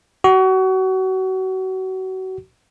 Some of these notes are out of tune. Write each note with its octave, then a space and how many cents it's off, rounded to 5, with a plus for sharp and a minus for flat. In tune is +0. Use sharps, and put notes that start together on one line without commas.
F#4 +30